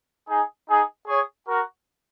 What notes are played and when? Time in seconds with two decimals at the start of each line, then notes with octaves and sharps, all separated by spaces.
0.28 D#4 G#4
0.69 D#4 G#4
1.08 G#4 C#5
1.48 F#4 A#4